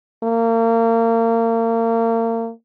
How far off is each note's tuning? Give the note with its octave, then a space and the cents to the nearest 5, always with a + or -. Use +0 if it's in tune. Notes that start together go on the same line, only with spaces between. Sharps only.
A#3 -30